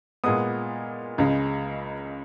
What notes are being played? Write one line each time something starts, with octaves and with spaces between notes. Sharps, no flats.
A#2 G#3 B3 D#6
C#2 C#3 G#3